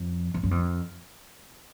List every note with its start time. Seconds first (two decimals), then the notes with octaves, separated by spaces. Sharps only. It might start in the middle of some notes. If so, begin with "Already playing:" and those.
Already playing: F2
0.34 F2
0.43 F#2
0.51 F2